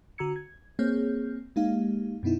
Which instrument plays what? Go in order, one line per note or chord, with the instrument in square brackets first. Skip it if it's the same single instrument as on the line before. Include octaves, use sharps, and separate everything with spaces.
[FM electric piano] D3 F#4 A#5 E6 G#6 C#7
G#6
A#3 C4 G#4 C#5 F6 G6
G#3 A#3 D#4 G4 F5
F#2 B2 B3 D#4 E4